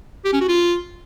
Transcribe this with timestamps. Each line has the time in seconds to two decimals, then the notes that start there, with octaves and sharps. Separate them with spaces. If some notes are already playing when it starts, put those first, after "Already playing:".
0.25 G4
0.33 C#4
0.41 F#4
0.48 F4